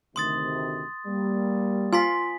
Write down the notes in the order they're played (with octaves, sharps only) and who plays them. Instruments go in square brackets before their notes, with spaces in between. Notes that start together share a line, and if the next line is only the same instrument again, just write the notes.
[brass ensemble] D2 C3 D#3 [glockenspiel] C6 D#6 A6
[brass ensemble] G3 A#3
[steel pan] F4 [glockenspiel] G#5 C6 B6